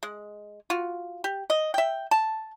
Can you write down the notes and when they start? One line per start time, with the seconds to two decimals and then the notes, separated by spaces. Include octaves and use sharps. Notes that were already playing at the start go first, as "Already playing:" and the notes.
0.03 G#3
0.70 F4 F#4
1.24 G4
1.50 D#5
1.74 E5 G5
2.11 A5